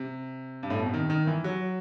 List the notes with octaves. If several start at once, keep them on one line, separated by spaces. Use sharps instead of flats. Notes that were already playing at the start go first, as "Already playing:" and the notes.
Already playing: C3
G2
A2
B2
C3
D#3
D#3
E3
F#3